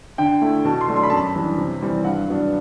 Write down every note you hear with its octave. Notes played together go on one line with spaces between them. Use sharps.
D3 G5
A3 E4
B2 A5
C6
F#3 A3 D4
C6
B5
F#2 A5
B5
E3 G3 D4
C3
E3 G3 C4
G2 F#5
F#3 B3 D4